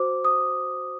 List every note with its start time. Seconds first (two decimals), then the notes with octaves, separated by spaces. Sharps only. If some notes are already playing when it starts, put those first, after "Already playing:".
Already playing: F#4 C5 D6
0.25 D#6